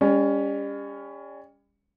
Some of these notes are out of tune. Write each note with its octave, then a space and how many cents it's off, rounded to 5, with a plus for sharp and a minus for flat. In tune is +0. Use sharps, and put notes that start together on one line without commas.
G3 +40 C#4 +20